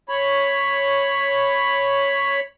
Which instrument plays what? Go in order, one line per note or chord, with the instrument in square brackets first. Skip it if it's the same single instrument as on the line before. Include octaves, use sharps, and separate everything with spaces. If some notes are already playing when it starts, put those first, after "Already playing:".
[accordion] C#5 B5